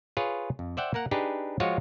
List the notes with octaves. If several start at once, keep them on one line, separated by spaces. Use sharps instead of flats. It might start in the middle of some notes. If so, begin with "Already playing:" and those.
F4 G#4 B4 C#5
F2
C5 D5 E5 F#5 G5
A#3 A#4 F#5
D4 D#4 G4 G#4 B4
F3 G#3 F4 F#4 C#5